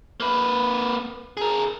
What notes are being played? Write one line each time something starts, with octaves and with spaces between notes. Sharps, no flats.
A#3 B4
G#4 A#4